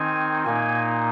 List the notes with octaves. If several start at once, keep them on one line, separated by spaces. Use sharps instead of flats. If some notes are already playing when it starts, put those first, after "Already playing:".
Already playing: D#3 C4 D#4 G#5
A#2 A#3 D#4 G#5